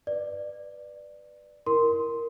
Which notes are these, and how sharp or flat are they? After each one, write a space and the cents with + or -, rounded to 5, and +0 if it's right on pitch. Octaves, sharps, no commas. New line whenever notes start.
B4 +0 D5 +15
E4 +0 A#4 +0 C6 +0